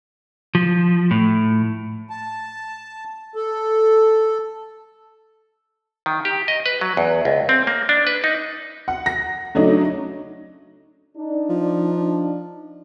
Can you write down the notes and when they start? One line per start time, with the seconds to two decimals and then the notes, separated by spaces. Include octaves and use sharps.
0.55 F3
1.11 A2
2.10 A5
3.35 A4
6.06 D#3
6.25 G4
6.48 D#5
6.66 B4
6.81 F#3
6.97 E2
7.25 C#2
7.49 C4
7.67 A#3
7.89 D4
8.07 B4
8.24 D#4
8.88 F#5
9.06 A#6
9.55 C#3 F#3 A3 D4 D#4
11.17 D4 D#4
11.49 F3